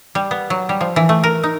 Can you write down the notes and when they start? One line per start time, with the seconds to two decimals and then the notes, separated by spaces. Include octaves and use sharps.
0.15 G3
0.31 B3
0.50 F#3
0.69 G3
0.81 F3
0.96 E3
1.09 A3
1.24 A#4
1.43 D#4